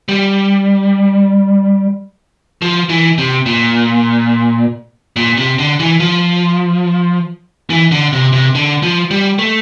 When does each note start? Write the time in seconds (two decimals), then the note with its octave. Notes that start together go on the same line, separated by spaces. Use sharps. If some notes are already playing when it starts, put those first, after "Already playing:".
0.09 G3
2.62 F3
2.90 E3
3.18 C3
3.46 A#2
5.16 A#2
5.37 C3
5.59 D3
5.80 E3
6.00 F3
7.70 E3
7.92 D3
8.13 C3
8.33 C3
8.55 D3
8.83 F3
9.11 G3
9.39 A3